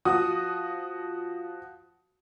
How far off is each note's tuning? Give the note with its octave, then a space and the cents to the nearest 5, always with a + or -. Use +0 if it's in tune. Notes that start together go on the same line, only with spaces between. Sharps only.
F3 +0 F#4 +0 D#6 +0